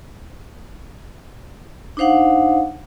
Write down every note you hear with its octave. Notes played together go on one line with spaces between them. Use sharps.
D4 D#4 C5 F5 F#5